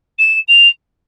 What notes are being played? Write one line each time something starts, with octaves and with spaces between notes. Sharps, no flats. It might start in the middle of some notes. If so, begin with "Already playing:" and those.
E7
F7